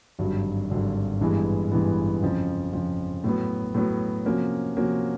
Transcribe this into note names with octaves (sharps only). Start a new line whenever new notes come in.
G#1 G2 D3 F#3
G#1 G2 D3 F#3
A1 G2 E3 G#3 B3
A1 G2 E3 G#3 B3
F2 C#3 F3
F2 C#3 F3
A2 F#3 B3
A2 F#3 B3
C3 F3 A#3 C#4 F#4
C3 F3 A#3 C#4 F#4